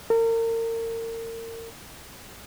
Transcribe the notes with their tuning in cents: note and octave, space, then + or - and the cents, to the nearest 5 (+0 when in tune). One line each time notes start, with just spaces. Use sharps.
A#4 -35